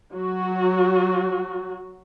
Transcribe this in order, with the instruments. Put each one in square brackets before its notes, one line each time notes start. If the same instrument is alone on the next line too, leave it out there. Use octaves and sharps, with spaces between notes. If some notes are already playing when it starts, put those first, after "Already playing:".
[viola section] F#3 F#4